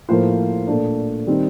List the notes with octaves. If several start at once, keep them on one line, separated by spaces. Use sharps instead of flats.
A2 F3 A#3 F4 C5
A#2 A3 D4
D#3 G3 C4 D#4